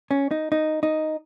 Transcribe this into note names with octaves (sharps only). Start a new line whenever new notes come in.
C#4
D#4
D#4
D#4